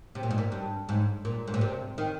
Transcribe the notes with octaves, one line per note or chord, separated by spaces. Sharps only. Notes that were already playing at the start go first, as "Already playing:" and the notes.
C3
A#2
G#2
A#2
G2
G#2
A#2
G#2
A#2
C3
D#3